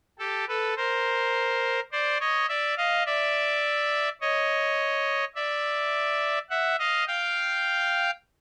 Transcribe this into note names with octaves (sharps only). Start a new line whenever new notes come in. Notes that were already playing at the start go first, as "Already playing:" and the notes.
G4 A4
A4 B4
A#4 C5
C5 D5
C#5 D#5
D5 E5
D#5 F5
D5 E5
C#5 D#5
D5 E5
E5 F#5
D#5 F5
F5 G5